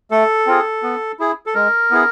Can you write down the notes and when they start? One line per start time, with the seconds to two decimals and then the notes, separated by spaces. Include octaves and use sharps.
0.11 A3 A4
0.47 C4 F4 G#4
0.83 B3
1.20 E4 G#4
1.46 A4
1.54 G#3 A#4
1.91 B3 E4 G#4